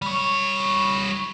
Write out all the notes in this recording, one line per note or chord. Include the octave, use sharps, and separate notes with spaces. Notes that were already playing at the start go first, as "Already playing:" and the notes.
G3 C#5